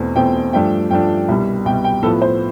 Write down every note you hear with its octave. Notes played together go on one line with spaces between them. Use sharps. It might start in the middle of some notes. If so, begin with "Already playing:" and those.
Already playing: E2 B2 A3 C4
E2 B2 A3 C4 G5
G2 F3 A3 D4 G5
G2 F3 A3 D4 G5
C2 B2 G3
C2 B2 G3 G5
G5
A2 F3 B3 A4
C5